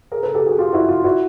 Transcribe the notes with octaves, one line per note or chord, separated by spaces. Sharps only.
G#4 A#4
A4 B4
G4 A4
F#4 G#4
F4 G4
E4 F#4
F4
E4 F#4